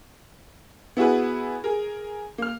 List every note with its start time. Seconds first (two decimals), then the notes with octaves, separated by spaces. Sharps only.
0.97 B3 E4 F#4 G#4 B4
1.64 G#4 A#4
2.38 A#3 F6